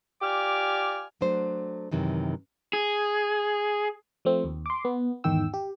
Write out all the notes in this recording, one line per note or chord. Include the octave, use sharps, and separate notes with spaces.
F4 G4 D5 G#5 D6 F6
F#3 A3 D4 C5
F#2 C3 D#3 E3
G#4
F3 A3 C4
D#2
C6 D6
B3
E2 G#2 D#3 G5 E6
G4